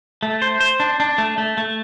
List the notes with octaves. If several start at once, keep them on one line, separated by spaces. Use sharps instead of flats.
A3
C5
C5
D4
D4
A3
A3
A3